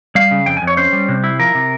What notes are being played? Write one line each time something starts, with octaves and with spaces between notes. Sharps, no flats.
G3 F5
C#3
F2 G5
G#5
F2
C#5
C#4 C5
G3
C3
E4
F3 A#4
C3